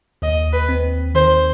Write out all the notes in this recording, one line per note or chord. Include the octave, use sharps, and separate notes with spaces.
D#2 D#5
B4
C4
D#3 C5